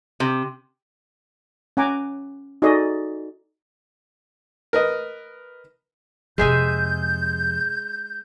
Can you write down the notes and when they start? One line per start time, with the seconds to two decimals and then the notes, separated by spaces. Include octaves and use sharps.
0.20 C3
1.77 C#4 F#5 G#5 A#5 D6
2.62 D#4 F#4 G#4 A4 D5 D#5
4.73 A#4 B4 D#5
6.38 F2 C3 G#3 G#4 E5 G6